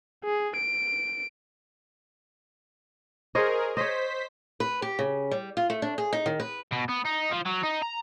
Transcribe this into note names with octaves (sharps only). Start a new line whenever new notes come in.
G#4
D7
G#4 A#4 C5 C#5 D#5
C5 C#5 D#5 B6
B4
G4
C#3
G3
F4
A3
D4
G#4
D#4
D#3
B4
B2
B3
D#4
F3
F#3
D#4
A#5